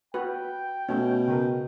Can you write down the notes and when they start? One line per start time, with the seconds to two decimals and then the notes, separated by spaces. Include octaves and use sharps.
0.14 F#4 B4 G5
0.89 B2 A3 C#4
1.28 C#3 A#4